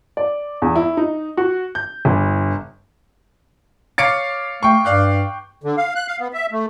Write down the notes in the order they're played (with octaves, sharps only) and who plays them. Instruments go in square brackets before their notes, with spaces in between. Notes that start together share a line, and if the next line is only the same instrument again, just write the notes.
[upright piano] D5
E2
E4
D#4
F#4
G6
G1
[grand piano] C#5 F5 D6 [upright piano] A6 C#7 D7
[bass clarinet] A3 [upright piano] G5 C#6
[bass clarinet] G2 [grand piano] D5 F5 F#6
[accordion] D3
F5
F#6
F5
B3
E5
A3